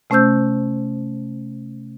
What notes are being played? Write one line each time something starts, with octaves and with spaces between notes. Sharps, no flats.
C3 A3 C#4 C5 E6 G6